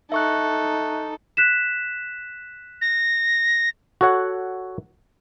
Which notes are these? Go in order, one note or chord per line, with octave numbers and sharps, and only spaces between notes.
D#4 A4 E5 C#6 F#6
F#6 B6 E7
A#6
F#4 A4 C#5 F#5